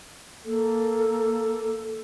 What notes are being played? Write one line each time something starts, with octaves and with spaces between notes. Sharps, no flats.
A#3 A4